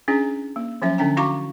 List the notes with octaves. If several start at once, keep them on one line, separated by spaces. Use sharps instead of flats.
C#4 D4 E4 G#4
A#3
F3 F#3 C#4 E4 E5
D3 C#4 D4 G5 A#5
E4 F#4 F5 A#5 C#6 D6